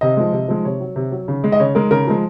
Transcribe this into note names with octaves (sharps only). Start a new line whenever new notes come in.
C3 D#5
F3 G#3
C3
F3 G#3
C3 C#5
F#3
C3
F#3
C#3
G#3
D#5
C#3 C#5
G#3 A#4
C#3 A#4
F3 G#3